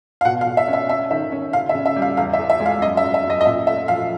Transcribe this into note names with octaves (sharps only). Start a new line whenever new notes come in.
F5
B2 F#5
F5
B2
E5
C#4 E5
C#4 E5
D#3 E5
C#4
C#3 F5
E5
C#3
E5
G3
F5
E2 F5
E5
E2
E5
G#3
F5
F#2 D#5
E5
F#2
E5
F#2
D#5
D#5
A#2 E5
A3 E5
F3 F5